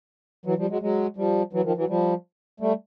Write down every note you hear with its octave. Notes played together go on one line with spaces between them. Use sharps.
E3 F#3
F3 G3
F#3 G#3
F#3 G#3
F3 G3
E3 F#3
D#3 F3
E3 F#3
F3 G3
G3 A3